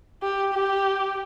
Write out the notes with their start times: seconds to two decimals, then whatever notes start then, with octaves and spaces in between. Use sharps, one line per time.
0.22 G4
0.54 G4